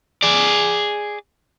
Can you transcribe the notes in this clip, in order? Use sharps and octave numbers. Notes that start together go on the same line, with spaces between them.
G#4 D5